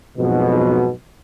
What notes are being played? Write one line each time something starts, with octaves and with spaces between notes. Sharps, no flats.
B1 F2 G#2 B2